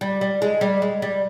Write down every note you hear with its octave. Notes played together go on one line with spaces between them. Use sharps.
G3
G3
G#3
G3
G#3
G3